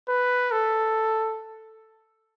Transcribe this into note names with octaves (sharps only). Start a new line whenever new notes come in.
B4
A4